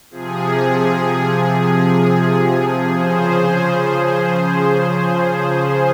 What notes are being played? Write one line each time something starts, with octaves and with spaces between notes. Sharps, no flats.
C3 F3 G#4
G#4
C#3 F3 G#4 C5